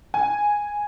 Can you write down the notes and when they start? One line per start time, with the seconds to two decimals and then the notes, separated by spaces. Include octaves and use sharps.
0.14 G#5